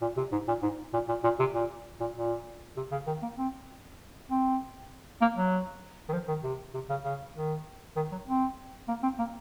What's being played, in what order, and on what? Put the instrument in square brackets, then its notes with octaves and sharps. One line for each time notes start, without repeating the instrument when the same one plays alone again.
[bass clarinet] A#2
C3
G#2
A#2
G#2
A#2
A#2
A#2
C3
A#2
A#2
A#2
C3
C#3
D#3
A#3
C4
C4
A#3
F#3
D#3
F3
D#3
C3
C3
C#3
C#3
D#3
D#3
F#3
C4
A#3
C4
A#3